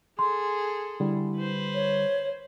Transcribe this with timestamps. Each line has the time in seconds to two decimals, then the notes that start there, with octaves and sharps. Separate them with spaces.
0.19 G#4 A4 C6
1.00 D3 G3 E4
1.37 B4 C5
1.74 C#5